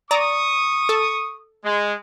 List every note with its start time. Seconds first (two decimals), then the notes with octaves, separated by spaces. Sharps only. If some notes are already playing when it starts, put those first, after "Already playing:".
0.11 D5 A#5 C#6 D#6
0.89 A4
1.64 G#3